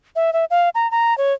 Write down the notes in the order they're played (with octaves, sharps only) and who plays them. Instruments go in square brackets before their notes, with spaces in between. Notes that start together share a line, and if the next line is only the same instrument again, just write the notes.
[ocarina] E5
E5
F5
A#5
A#5
C#5